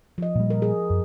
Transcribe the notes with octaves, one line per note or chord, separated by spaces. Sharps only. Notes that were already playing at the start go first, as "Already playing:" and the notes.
F3 D#5
A#2 G3
A#4
G#4
F#2